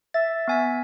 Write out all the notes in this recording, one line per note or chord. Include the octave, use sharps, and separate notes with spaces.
E5 A6
B3 G#5 B6